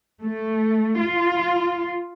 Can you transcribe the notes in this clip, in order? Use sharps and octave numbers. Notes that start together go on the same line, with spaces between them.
A3
F4